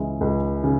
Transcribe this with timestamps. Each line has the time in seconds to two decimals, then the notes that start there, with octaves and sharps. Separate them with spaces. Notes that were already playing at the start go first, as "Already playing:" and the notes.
Already playing: C#2 C#3 E3 G#3
0.21 C#2
0.64 C#3